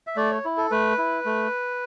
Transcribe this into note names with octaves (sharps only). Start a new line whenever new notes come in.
E5
A3 D5
C#5
E4
A4
A3 B4
E4
A3